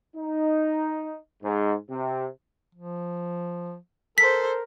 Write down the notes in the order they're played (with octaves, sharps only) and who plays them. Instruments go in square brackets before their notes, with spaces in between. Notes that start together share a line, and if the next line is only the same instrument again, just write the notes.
[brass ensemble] D#4
G#2
C3
[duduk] F3
[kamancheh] A4 C5 [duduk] A#4 [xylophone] B6